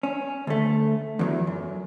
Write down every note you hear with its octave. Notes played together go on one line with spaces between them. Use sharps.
C#4
D2 A3
E2 E3 F#3
F#2